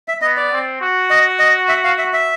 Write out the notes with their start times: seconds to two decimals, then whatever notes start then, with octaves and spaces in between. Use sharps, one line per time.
0.08 E5
0.22 B3 D#5
0.37 D5
0.52 C4
0.81 F#4
1.10 D#5
1.39 D#5
1.69 E5
1.84 F5
1.98 E5
2.13 E5